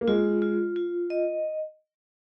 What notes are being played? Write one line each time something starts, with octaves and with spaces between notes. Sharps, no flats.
A#3
G#3 F4
F4
F4
D#5